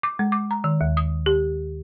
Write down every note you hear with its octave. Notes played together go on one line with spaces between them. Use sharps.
D6
G#3
D6
A#5
D#3
D#2
D#6
G4